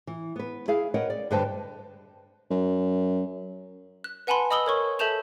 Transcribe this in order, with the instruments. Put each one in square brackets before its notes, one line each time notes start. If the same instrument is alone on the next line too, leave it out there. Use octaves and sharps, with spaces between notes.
[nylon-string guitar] E3
B3 B4
E4 G#4 F5
A#4 B4 C#5 D#5 F#5 G5
D5
G2 D3 B4 C5 G5 A5
[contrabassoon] F#2
[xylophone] F#6
B4 F#5 G#5 A5 B5 C6
D#5 B5 D#6 E6 F#7 G7
A#4 C#5 C#6
A4 E5 A5 G6 E7 F7